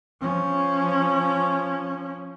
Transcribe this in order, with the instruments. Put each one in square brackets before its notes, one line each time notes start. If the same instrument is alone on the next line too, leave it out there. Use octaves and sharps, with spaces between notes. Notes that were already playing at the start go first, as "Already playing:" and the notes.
[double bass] F3 C#4